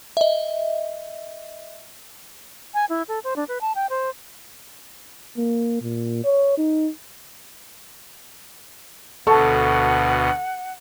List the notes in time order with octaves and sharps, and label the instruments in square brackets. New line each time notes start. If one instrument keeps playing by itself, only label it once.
[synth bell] D#5 E5
[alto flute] G#5
E4
A4
C5
D4
B4
A5
G5
C5
[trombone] A#3
A#2
C#5
D#4
[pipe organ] D2 B2 [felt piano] A4 A5 C#6 [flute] F#5